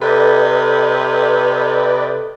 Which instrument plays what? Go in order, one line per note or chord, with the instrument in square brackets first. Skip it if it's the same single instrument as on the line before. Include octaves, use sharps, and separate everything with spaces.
[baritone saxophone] C3 [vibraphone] A4 [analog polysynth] B4 D5 D#5